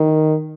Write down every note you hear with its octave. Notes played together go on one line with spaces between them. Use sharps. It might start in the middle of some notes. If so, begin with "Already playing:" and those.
Already playing: D#3